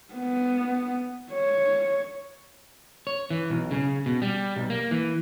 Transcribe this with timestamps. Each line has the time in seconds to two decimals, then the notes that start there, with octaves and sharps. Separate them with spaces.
0.14 B3
1.32 C#5
3.07 C#5
3.30 E3
3.50 B1
3.71 C#3
4.06 B2
4.22 G3
4.56 B1
4.70 A#3
4.91 E3